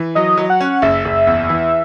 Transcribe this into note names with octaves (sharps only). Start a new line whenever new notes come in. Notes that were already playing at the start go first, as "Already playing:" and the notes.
Already playing: E3
F#3 D#5
F#3
F#5
C#4
F#1 E5
F#1
E2
E3